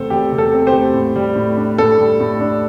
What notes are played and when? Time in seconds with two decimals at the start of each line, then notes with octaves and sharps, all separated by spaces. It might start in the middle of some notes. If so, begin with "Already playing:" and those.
Already playing: E2 C3 A3 C4 A4 C5
0.10 E2 G4
0.32 C3
0.38 A4
0.53 C4
0.67 G4 C5
0.73 A3
0.94 A2
1.16 G3
1.36 A2
1.57 D4
1.78 A2 A4
1.98 G3
2.20 A2
2.40 D4